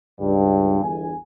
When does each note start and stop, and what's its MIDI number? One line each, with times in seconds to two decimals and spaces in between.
0.19 0.80 37
0.19 0.80 43
0.83 1.12 31
0.83 1.12 40
0.83 1.12 80